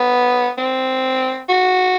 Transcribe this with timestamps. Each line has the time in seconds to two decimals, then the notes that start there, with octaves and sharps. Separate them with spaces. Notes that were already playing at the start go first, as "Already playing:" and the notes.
Already playing: B3
0.58 C4
1.49 F#4